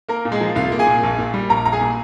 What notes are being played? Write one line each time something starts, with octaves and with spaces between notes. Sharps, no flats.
A#3 A#4
A#2
G#3 G#4
F3
C2 F4 F5
A#3
G#4 G#5
A#2
A#1
A#2
G3
A#1 A#4 A#5
A#1 A#5
G#4 G#5
A#2